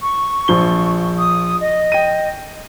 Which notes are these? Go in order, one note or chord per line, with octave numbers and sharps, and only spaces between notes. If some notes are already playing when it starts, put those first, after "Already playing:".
C#6
A#1 F3 G7
D#6
D#5
G5 D#7